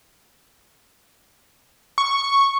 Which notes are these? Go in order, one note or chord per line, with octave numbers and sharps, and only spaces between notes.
C#6